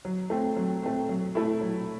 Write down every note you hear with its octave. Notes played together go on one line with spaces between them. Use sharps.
F#3
A3 C4
F#3
A3 C4
F#3
A3 E4 A4
F#3